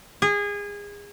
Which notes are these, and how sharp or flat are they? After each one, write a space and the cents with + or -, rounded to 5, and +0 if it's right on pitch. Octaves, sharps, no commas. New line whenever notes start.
G#4 -25